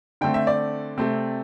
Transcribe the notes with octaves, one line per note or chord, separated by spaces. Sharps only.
D3 A3 C4 G5
E5
D5
C3 A3 C4